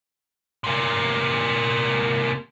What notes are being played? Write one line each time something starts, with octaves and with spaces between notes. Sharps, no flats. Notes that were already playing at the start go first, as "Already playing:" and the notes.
C3 A#3